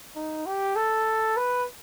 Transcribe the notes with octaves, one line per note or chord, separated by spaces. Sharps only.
D#4
G4
A4
B4